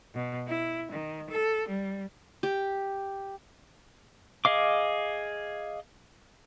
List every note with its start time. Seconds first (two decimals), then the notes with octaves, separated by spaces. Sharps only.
0.14 B2
0.48 E4
0.90 D#3
1.30 A4
1.68 G3
2.43 G4
4.45 G#4 D#5 F5 D6